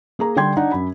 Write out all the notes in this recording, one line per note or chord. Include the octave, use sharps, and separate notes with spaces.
A#3 G#4 A#5
D3 G3 G5 C6 G#6
D4 D#4 F#5
F#2 B5